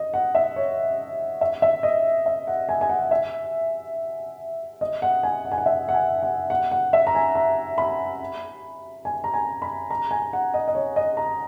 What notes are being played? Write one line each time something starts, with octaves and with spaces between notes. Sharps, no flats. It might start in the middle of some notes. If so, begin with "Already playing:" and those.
Already playing: D#5
F#5
E5
C#5
E5
E5
D#5
E5
F#5
G#5
G#5
F#5
E5
D#5
F#5
G#5
F#5
G#5
F#5
E5
F#5
G#5
F#5
F#5
F#5
E5
A#5
G#5
A#5
B5
G#5
A#5
G#5
B5
A#5
G#5
F#5
D#5
D#5
C#5
D#5
A#5